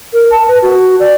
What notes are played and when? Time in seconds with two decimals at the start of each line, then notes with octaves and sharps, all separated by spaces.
0.13 A#4
0.31 A5
0.48 B4
0.62 F#4
1.00 D5